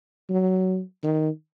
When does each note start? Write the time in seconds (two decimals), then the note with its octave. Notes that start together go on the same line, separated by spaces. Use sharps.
0.30 F#3
1.04 D#3